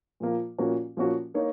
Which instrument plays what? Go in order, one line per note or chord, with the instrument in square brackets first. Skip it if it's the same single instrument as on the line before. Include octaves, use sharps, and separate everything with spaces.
[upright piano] A#2 F3 A#3
A#2 F3 A#3 C#4 F#4
A#2 F3 A#3 C#4 F#4
A#3 D#4 A#4 C#5